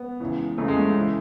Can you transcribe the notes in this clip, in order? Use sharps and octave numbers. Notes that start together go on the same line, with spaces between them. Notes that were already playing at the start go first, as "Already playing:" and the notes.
Already playing: B3
C#2 C#3 E3
C#2 C#3 E3 A3
G#3
A3
C#3 E3